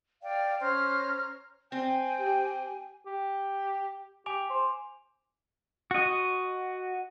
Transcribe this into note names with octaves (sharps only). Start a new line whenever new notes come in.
D5 F5 G5
C#4 C5 A#5 F6
C4 G5 G#5
G4
G4
G4 G#5 D6 F7
C5
F#4 D#5